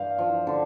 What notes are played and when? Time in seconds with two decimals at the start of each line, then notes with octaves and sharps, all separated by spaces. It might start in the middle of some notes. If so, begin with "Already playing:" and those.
Already playing: G2 F5
0.18 F3
0.47 D3